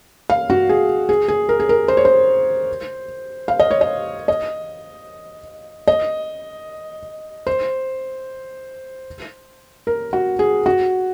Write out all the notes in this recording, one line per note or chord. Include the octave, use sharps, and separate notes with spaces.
F5
F#4
G#4
G#4
G#4
A#4
G#4
A#4
C5
C#5
C5
F5
D#5
C#5
D#5
D#5
D#5
C5
A#4
F#4
G#4
F#4